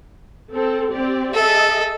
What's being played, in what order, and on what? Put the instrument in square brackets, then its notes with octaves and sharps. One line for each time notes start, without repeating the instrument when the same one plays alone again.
[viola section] C4 A4
C4 G4 D5
[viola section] G#4 D#5 E5 [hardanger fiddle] A4